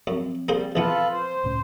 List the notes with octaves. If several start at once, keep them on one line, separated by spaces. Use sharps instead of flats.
F#2 F3 C4
G3 A#3 G#4 C5
A#1 E3 B3 F4 A4 B4
C5
C#2 A2 C#4